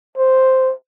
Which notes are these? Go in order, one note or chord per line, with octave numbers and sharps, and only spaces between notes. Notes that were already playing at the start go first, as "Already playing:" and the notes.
C5